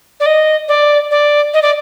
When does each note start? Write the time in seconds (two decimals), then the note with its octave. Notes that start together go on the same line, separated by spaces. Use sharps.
0.20 D5
0.26 D#5
0.68 D5
1.11 D5
1.54 D#5
1.62 D5